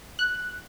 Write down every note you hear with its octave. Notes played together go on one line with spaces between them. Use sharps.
F#6